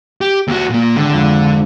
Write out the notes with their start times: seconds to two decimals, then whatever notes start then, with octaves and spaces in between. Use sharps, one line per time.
0.21 G4
0.48 D#2 F#4 A4
0.70 A#2 A#3
0.96 G#1 D3
1.13 F2